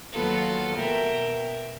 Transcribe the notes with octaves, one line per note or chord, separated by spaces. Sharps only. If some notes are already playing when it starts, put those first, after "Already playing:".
D#2 F#3 B3 F4 A4
B2 A#4 E5 G5